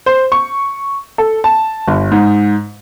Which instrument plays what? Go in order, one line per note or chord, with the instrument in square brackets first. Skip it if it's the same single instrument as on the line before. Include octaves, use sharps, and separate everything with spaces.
[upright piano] C5
C#6
A4
A5
G1
G#2